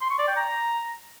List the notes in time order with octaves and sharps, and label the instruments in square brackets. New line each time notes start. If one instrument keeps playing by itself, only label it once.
[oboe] C6
C#6
D5
G5
A#5